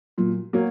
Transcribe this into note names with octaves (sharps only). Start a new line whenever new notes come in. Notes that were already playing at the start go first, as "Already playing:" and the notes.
A#2 F#3
F#3 A#3